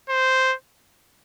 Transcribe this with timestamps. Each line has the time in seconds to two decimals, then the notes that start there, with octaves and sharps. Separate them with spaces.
0.09 C5